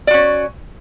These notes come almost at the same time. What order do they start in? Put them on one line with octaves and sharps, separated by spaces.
D5 F#4 C#4